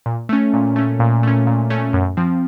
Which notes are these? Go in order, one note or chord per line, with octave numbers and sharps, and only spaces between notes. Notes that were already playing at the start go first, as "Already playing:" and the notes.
A#2
A3 C#4
A#2
A3 C#4
A#2
A3 C#4
A#2
A3 C#4
F#2
F3 C4